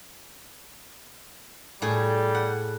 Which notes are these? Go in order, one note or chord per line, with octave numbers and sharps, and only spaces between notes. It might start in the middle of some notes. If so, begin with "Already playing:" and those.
A2 G3 G#4
F#5